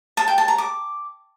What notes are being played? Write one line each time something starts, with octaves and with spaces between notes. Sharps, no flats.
A5
G5
A5
A#5
D6